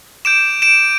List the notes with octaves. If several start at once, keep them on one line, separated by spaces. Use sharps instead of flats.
D6 G6 D7 E7
D7 E7